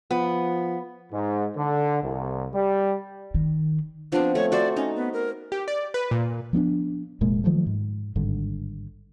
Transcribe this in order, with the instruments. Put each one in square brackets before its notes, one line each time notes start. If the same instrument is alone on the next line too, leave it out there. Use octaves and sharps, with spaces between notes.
[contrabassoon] F3 [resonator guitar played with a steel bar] B3
[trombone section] G#2
D3
C2
G3
[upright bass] D#3
[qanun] F3 B3 C4 [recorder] D4
[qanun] A3 [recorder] C#5
[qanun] F#4 C5 E5 [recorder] D5
[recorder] C#4 [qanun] D#4
[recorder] B3
A#4
[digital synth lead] G4
D5
B4
A#2
[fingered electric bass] F3 B3 C#4 D4
F1 A#2 G#3 A#3
D#3 F3 F#3 A3
G#2
G#1 G2 D3